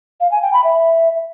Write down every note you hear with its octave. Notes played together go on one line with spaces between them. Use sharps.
F5
G#5
G5
B5
E5